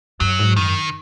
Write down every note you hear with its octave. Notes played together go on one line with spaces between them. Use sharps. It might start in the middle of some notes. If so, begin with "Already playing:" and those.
F#2 F#3
G#2
F#2 D#3